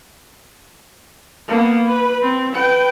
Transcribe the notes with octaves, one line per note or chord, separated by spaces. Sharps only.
A#3 B3
B4
C4
B4 G5